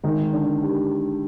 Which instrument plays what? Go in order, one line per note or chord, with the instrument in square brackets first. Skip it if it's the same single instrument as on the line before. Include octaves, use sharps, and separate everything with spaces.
[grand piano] D#3 [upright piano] G#3
[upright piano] D3
G4